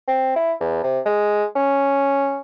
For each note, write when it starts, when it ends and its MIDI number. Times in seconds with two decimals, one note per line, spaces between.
0.08 0.35 60
0.36 0.53 64
0.60 0.82 40
0.84 1.00 48
1.06 1.45 56
1.56 2.41 61